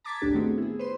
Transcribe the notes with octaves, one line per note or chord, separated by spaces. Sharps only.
A5 A#5 D6 G#6 A6 B6
G#1 D2 A2 D4 G4
D#3 A3 B3 C4 F#4 G#4
E4 G#4
B4 C5 C6